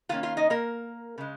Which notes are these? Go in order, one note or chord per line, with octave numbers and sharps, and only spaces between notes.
D#3 A#3 C#4 F4 F5
F4 F5
D#4 D#5
A#3 A#4
C#3 G#3